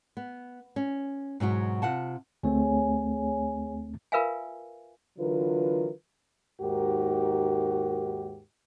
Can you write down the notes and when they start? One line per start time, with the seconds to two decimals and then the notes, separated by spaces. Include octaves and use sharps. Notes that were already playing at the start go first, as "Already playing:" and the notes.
0.17 B3
0.76 C#4
1.40 G#2 B2 F#3 F#4
1.82 C3 F4 F#5 A5
2.43 D2 A3 C4 G#4 C#5 G#5
4.12 F4 A#4 B4 E5 F5 G#5
5.19 D3 E3 F#3 F4 A#4 B4
6.61 D#2 G#2 F#4 G4 A#4